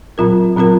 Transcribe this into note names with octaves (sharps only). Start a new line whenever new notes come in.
A#2 F#3 C4 F4 A#4
A#2 F#3 C4 F4 A#4